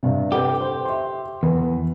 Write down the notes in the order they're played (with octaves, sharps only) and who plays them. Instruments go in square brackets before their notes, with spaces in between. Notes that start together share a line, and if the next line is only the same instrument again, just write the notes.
[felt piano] G2 C3
[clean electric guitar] G4 [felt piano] A4 B4 G5
[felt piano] C5
E5 C6
[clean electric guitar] E2 [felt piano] B4